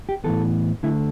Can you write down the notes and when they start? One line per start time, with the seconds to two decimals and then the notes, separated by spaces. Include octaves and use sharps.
0.09 G4
0.24 A2 E3 B3 A4
0.83 D3 A3 E4